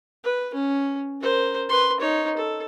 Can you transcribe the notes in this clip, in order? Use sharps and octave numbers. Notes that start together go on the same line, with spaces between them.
B4
C#4
A#4 C5
B4 C6
D#4 C#5
A4